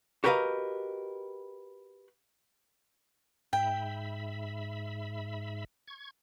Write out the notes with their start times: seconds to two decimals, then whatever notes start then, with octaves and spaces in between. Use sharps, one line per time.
0.24 F#4 G4 A#4 B4 D#5 F5
3.53 G#2 E5 G5 B5
5.88 C#6 G#6